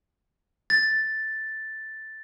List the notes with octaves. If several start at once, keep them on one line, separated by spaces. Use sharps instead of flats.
A6